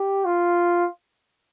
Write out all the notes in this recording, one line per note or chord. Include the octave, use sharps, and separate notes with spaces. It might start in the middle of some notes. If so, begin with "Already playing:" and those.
Already playing: G4
F4